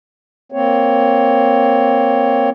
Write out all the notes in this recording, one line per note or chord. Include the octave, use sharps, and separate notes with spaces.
A#3 C4 C#5